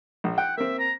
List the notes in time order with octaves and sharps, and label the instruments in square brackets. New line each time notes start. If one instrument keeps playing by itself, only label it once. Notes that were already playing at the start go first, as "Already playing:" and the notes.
[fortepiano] A#1
[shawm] F#5 [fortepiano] G5
[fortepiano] A#3 C4 [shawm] E5
[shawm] A#5